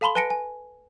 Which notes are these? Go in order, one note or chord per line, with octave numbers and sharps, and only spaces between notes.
A4 F5 A5 B5 C6 G7
B4 G#5 A5 A#6 C#7 D7
G#5